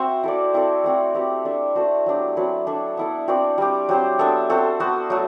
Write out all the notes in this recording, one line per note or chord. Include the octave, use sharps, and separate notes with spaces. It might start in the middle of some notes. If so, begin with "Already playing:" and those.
Already playing: C4 F#4 C5 E5
E4 A4 D5
C4 E4 A4 D5
A3 C4 F#4
C4 G4 B4
D4 A4 E5
A3 D4 F#4 C5
F#3 B3 D4 G4
F#3 C4 E4 B4
D4 A4 E5
B3 E4 A4
C4 F#4 B4 D5
G3 C4 G4
F#3 C4 G4 C5
B3 D4 A4 E5
C4 F#4 A4 C5
B3 F#4 C5
F#3 A3